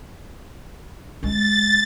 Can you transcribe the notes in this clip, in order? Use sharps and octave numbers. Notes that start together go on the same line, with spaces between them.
G#3 D#4 A6